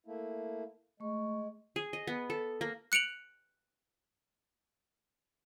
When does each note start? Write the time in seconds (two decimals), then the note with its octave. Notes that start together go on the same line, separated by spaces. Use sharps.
0.06 A3 A#3 E4
1.00 G#3 A3 C#6
1.76 G#4
1.93 D#5
2.07 B3
2.30 A4
2.61 A#3
2.92 F#6 C#7 D7 F7 F#7